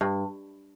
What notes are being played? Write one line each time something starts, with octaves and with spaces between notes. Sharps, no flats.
G2